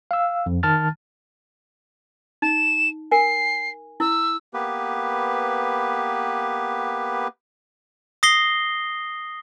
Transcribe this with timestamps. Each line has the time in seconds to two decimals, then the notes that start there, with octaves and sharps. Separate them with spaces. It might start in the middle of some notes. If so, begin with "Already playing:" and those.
0.11 F5 E6
0.46 F2
0.63 D#3 A5 F6 A6
2.42 D#4 E7
3.11 A#4 G#5 C7
4.00 E4 E6
4.54 A#3 B3 G4 B4
8.23 D#6 A#6 C7 G7